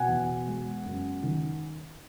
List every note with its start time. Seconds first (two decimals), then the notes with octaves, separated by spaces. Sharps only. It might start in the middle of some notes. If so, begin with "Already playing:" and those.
Already playing: B2 F#5 G#5
0.08 E2
0.47 G#3
0.86 F#2
1.23 D#3